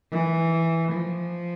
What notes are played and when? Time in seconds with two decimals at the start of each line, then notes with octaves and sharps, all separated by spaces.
0.11 E3
0.92 F3